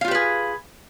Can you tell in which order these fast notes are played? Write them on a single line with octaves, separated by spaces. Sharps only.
F5 F4 G4 B4 G#4